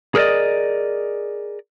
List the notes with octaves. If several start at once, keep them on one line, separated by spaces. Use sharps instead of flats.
G#4 A#4 C5 D5 D#5